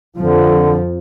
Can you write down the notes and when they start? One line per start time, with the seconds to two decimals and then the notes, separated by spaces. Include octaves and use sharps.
0.18 F2 D3 F3